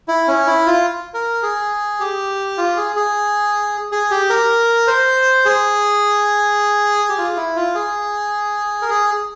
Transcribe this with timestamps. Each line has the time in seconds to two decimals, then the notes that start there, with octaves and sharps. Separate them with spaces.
0.08 E4
0.28 C#4
0.47 E4
0.66 F4
1.14 A#4
1.43 G#4
2.00 G4
2.58 F4
2.77 G#4
2.96 G#4
3.92 G#4
4.11 G4
4.30 A#4
4.87 C5
5.45 G#4
7.09 G4
7.18 F4
7.37 E4
7.56 F4
7.75 G#4
8.82 A#4
8.90 G#4